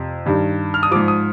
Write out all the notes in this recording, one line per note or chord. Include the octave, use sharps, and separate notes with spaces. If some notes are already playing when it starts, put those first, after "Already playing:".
Already playing: F2 C3
G2 D#3 G3
F6
D#6
G#2 F3 D6
D#6